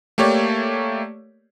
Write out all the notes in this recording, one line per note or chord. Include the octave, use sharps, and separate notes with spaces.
A3 A#3 G4 C#5 D5